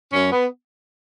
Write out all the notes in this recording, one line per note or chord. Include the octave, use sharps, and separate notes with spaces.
F#2 C#4
B3